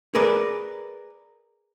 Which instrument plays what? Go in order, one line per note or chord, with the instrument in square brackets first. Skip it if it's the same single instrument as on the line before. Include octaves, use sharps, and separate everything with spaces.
[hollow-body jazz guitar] G#4 A#4 B4 D5